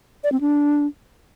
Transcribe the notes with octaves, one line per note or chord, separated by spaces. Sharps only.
D5
C4
D4